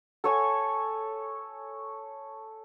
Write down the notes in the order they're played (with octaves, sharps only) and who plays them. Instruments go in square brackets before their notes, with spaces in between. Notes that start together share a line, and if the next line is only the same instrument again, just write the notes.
[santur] A4 C#5 G#5